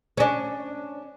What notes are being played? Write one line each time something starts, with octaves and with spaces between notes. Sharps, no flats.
C#4 D4